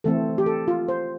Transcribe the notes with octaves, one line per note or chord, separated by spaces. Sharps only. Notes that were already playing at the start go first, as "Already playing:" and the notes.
E3 A3 C4 A4
G4
A4
F4
C5